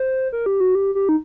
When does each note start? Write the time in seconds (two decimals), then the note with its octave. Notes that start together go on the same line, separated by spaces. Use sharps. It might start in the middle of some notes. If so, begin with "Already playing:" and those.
Already playing: C5
0.33 A#4
0.46 G4
0.60 F#4
0.75 G4
0.95 G4
1.09 D#4